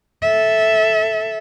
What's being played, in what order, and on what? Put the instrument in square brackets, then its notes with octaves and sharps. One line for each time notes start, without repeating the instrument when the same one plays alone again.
[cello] A4 E5